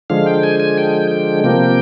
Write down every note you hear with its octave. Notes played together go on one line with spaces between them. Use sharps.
D3 F3 G#3 F5
G5
G#5
G#5
G5
G5
C3 F3 A#3 G5